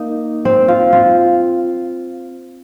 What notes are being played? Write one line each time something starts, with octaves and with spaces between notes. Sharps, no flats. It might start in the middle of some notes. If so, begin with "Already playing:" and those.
Already playing: A#3 D#4
C4
F4
F4